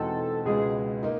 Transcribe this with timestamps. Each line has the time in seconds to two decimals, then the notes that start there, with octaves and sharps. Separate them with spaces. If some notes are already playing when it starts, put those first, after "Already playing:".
Already playing: E2 B2 G#3 C4 D#4 A4
0.45 C#2 B2 G#3 B3 G#4
1.03 A#3 D#4